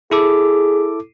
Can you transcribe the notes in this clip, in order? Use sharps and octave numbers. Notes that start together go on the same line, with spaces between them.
E4 G#4 A4 D6